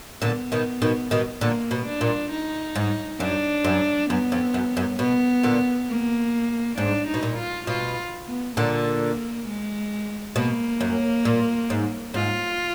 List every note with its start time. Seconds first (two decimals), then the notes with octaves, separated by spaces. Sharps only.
0.22 A#2 D3 B3
0.52 B2 D#3
0.82 B2 D#3
1.11 B2 D#3
1.41 A#2 D3 A#3
1.71 B2
1.86 D4
2.01 A#2
2.31 D#4
2.75 G#2
3.20 F#2 D4
3.64 F#2
4.10 F#2 B3
4.32 F2
4.54 F#2
4.77 F#2
4.99 B2 B3
5.43 A#2 D3
5.88 A#3
6.77 G#2 D4
7.08 D#4
7.14 B2
7.23 A#2
7.38 F4
7.67 B2 F4
8.27 B3
8.56 A#2 D3 A#3
9.47 G#3
10.35 B2 A#3
10.81 F#2
11.25 A#2
11.70 G#2
12.14 G#2 F4